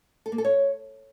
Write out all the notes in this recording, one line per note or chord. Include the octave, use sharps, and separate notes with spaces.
A4
A#3
A4
C#5